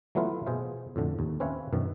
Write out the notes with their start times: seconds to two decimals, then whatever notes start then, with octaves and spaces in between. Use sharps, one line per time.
0.15 E3 F#3 A3 B3 E4 F4
0.46 B2 G#4 C5 F5
0.96 F2 A2 D3
1.19 D#2
1.40 C4 C#4 B4 C#5 E5 F5
1.73 F#2 B2 D#3